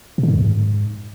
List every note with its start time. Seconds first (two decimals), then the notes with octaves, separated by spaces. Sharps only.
0.18 B2
0.23 D3
0.28 G#2
0.34 E2
0.39 G#2